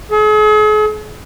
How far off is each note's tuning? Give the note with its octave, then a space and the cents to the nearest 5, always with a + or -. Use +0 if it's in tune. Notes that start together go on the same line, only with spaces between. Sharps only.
G#4 +45